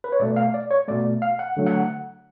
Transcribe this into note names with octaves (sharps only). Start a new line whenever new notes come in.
B4
C#5
B2 A3 D5
F5
D5
C#5
B2 A3 D5
F5
F#5
D3 F#3 A3
F#5